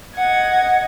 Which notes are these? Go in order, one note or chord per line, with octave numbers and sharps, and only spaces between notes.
D#5 F#5 G#6